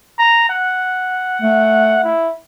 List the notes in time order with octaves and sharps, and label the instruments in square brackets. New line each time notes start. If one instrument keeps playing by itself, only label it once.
[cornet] A#5
F#5
[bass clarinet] A3
[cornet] E4